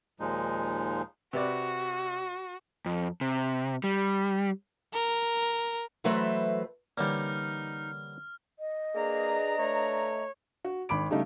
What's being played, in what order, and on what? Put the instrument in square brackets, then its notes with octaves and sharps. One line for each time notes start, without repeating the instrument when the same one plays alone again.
[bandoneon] D#2 A#2 F3 G#3 D#4
[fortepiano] C3 B4 D5 [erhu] F#4
[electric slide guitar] F2
C3
G3
[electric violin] A#4
[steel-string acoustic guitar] E3 F#3 A3 B4 C5 E5
[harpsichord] D3 E3 C#4 [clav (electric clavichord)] G3 A#3 [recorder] D#4 [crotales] F6
[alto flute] D#5
[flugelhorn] A#3 [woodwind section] D4 B4 A#5 [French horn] G#4
[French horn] A3 [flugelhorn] C#5
[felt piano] F#4
G#1 B5 D6 D7
C#3 G3 A3 D#4